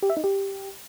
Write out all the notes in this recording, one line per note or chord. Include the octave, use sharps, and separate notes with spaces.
G4
E5
D#4
G4